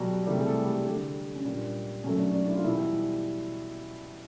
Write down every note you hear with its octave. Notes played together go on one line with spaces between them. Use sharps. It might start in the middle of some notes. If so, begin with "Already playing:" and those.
Already playing: B2 F#3 G3 F#4
C3 E3 G3 A3 G4
G#4
A3 A4
G3 G4
D3 G3
C#4
A#2 G3 D4
B2 F#3 A3 C#4
D4
D4
E4
F4
B2 E3 G3 E4